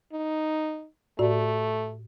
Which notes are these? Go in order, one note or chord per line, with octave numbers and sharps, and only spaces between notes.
D#4
A2 A3 F#4 D5